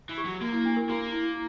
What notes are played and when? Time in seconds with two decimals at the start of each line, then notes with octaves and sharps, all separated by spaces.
0.09 E3
0.18 G4
0.25 F#3
0.41 A#3 F#4
0.53 E4
0.65 D4
0.77 A#4
0.89 A#3 F#4
1.13 E4